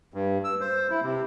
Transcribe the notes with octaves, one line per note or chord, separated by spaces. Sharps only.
G2
E6
C5
E4
C3